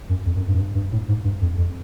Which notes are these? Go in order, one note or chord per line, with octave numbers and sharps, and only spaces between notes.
F#2
F2
F#2
G2
F#2
G2
G2
A2
G#2
G2
F2
F2